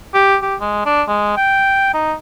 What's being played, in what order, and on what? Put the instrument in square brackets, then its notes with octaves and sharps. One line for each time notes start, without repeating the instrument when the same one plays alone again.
[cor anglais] G4
G4
G#3
D4
G#3
G5
D#4